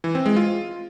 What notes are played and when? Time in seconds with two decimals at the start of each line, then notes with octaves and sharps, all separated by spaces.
0.04 E3
0.15 C4
0.26 G#3
0.36 F4